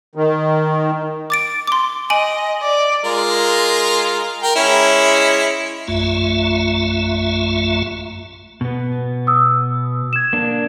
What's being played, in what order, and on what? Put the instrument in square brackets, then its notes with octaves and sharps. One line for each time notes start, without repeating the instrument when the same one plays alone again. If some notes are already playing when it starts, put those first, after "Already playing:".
[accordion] D#3
[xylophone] D6 A6 D7
C6 D6
[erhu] D#5 [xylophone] G#5 D7 F#7
[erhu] D5
[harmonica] G#3 F4 A#4
A#4 G5
G#3 C#4 E4
[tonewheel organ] A#1 F#2 A3 F4 E5
[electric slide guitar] B2 B3
[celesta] D#6 E6
G#6 E7
[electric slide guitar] A#3 D4